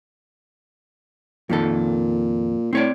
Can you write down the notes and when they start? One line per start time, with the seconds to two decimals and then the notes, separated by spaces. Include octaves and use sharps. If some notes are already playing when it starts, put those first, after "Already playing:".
1.50 F2 A#2 D#3 A4
2.73 A2 C4 C#5 D5